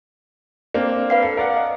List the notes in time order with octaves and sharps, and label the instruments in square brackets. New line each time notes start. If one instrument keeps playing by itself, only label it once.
[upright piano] A#3 C4 D4
[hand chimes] B4 F5 C7
[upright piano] A4
A#4 D5 F#5
[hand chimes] D#5